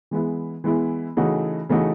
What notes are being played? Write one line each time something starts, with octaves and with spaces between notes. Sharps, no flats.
E3 G#3 B3 E4
E3 G#3 B3 E4
C#3 E3 A3 D#4 F#4
C#3 E3 A3 D#4 F#4